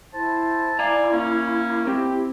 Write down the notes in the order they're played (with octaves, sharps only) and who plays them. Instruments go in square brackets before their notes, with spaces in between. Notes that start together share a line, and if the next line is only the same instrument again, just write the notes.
[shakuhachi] E4 [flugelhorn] C5 [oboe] A5
[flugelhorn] D5 [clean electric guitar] F5 A#5 [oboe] G#5
[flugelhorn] A#3 [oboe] C#4
[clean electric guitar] C4 [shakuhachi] E4 [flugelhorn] G4